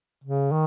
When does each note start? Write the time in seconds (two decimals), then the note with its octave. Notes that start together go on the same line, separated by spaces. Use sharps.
0.24 C#3
0.51 D#3